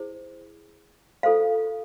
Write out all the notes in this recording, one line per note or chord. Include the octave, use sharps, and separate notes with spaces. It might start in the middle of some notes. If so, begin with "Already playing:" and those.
Already playing: E4 G#4 C5
F4 A4 C5 F5